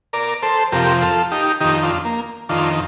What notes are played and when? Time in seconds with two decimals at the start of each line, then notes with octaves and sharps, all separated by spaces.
0.13 A#4 D5
0.42 A4 C5
0.72 F2 C3 F3 G4 A#4
1.02 F4 A4
1.31 D#4 G4
1.61 F2 D#3 D#4 G4
1.83 D4 F4
2.05 A#3
2.49 F2 D#3 D4 F4